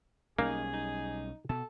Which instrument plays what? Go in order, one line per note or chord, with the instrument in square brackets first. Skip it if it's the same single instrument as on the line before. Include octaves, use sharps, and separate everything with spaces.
[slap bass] B1 G3 C#4 [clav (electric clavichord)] A#3 [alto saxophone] D#4 [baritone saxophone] G#4
[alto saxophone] D#4
[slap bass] B2 [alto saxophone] A4